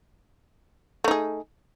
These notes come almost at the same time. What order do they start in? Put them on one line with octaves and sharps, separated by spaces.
A3 D#4 G#4